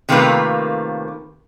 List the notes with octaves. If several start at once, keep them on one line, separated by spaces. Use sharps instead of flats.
C3 D#3 A3 A#3 F4 B4